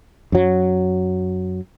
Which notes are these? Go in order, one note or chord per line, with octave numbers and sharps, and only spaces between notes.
F#2 F#3